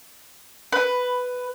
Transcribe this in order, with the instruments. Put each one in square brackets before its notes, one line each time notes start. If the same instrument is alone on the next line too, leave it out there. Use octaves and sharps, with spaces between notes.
[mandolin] B4